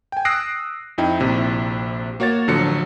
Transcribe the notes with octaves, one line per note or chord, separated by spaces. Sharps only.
G5 G#5
D#6 E6 F#6 A#6 C7 D7
F2 D#4 E4 G5
A#1 C3 E4
A#3 F#4 C#5 F#5 A6
A1 D3 F3 F#3 C#7